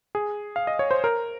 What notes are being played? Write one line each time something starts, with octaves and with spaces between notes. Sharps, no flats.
G#4
F5
D#5
C#5
C5
A#4